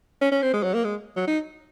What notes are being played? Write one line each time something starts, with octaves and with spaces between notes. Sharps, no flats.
C#4
C#4
C4
G#3
F#3
A#3
G#3
F#3
D#4